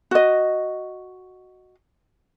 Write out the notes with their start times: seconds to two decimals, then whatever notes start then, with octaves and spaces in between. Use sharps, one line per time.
0.11 F#4 D#5